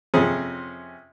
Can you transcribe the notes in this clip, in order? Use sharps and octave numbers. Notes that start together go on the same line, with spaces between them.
F2 C3 C#4 G#4